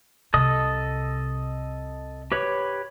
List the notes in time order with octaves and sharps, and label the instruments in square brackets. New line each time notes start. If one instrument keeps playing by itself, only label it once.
[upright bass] C2 C3 [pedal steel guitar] A4 D#5 D#6
[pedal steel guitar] G4 B4 C#5